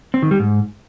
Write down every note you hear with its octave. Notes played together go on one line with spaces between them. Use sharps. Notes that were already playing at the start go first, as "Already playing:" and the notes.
C4
D#3
G3
G#2